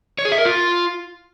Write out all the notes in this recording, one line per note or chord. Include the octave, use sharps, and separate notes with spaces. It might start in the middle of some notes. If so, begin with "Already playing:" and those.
C#5
G#4
E5
A#4
F4